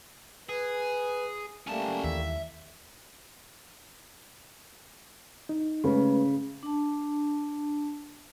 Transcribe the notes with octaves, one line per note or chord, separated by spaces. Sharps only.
G#4 B4
G3 A3 A#3 C#4 A5
D#2 E3 E5
D#4
C#3 G#3 A3 B4
D4 A5